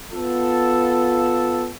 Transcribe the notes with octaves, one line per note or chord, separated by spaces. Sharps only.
B3 F4 A4